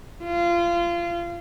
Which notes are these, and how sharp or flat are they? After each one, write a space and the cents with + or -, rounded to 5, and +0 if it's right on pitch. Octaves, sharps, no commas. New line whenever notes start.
F4 -25